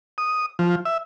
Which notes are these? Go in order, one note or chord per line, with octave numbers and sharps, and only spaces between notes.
D#6
F3
E5